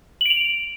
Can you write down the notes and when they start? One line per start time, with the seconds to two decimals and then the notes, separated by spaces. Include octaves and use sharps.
0.21 F#7
0.26 D7
0.30 F7